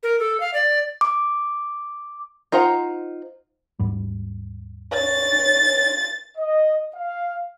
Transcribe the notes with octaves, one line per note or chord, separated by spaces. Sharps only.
A#4
A4
F5
D5
D6
D#4 F4 C5 F#5 A#5
D#2 G#2 G3
C#5 A6
D#5
F5